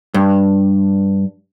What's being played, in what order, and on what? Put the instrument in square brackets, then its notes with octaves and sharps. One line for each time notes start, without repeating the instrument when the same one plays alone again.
[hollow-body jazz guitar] G2